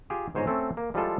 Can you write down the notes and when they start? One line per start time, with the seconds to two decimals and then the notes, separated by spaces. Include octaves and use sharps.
0.10 F4 G4 G#4
0.35 G1 G#2 C5 C#5 G#5 A#5
0.47 A3 C4 C#4 A4
0.77 A#3
0.94 F3 G3 G#3 E4 F4 A4